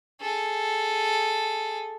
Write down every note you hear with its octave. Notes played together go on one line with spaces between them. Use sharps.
G#4 A4